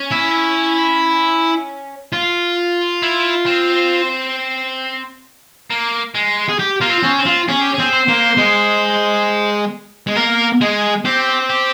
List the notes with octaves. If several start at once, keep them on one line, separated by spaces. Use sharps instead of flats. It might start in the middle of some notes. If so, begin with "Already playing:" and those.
Already playing: C#4
E4
F4
E4
C4
A#3
G#3
G#4
G4
A#3 F4
C4
C#4
C4
F4
C#4 G#4
G4
C4 G#4
C5
A#3
G#3
G#3
A#3 A#4
G#3 G#4
C4 G4
G4